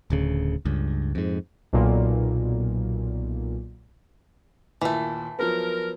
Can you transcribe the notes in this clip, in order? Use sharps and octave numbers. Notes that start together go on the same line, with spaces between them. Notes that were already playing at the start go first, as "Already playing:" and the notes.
D1 D2 C#3
C#2 G2
F2 G#2
B1 A#2
D#2 A#2 E3 A3 E4
F3 F#3 B3 A#4